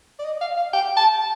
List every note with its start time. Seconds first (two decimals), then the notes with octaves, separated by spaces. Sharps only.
0.19 D5
0.25 D#5
0.41 F5
0.57 F5
0.73 G5
0.97 A5